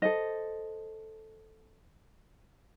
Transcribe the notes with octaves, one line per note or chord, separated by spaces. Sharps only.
A4 C5 D#5